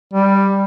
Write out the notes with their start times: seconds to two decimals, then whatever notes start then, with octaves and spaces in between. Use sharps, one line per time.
0.14 G3